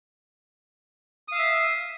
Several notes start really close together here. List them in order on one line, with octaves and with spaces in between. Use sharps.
D#6 F5 E6 E5